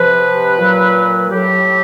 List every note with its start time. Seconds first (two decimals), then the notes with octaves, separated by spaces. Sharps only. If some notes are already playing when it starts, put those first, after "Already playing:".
Already playing: C3 F3 B4
0.58 A#2 F#3
1.30 A2 F#3 G4